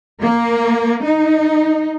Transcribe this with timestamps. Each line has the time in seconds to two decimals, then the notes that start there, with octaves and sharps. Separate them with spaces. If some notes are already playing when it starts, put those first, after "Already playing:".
0.22 A#3
1.04 D#4